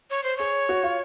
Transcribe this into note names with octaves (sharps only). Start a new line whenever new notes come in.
C#5
C5
G#4 C#5
F#4
F4